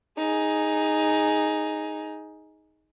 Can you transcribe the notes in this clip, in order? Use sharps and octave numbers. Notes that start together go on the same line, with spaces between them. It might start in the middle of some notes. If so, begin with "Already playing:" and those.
D#4 G#4